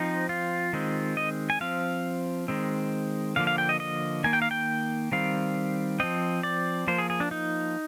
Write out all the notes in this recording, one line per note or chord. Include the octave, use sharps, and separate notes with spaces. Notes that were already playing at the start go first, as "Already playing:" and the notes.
Already playing: F3 C4 D#4
F4
D#3 G#3 C4
D#5
G#5
F3 C4 F5
D#3 G#3 C4
D3 F3 A#3 F5
F5
G5
D#5
D#5
D#3 A#3 G#5
G5
F5
G5
D#3 G3 C4 F5
F3 C4 D#5
D5
F3 A#3 C5
G#4
G#4
D4
D#4